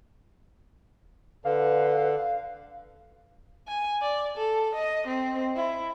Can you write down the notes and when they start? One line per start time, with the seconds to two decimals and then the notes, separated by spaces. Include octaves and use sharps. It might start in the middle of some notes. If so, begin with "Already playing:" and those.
1.45 D3 B4 F5
3.67 G#5
4.02 D5
4.37 A4
4.75 D#5
5.07 C4
5.56 E4